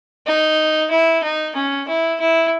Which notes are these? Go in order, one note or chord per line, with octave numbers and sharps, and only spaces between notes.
D#4
E4
D#4
C#4
E4
E4